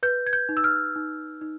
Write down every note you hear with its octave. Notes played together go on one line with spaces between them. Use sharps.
B4 G6
G#6
G6
D#4
E6
F6
D#4
D#4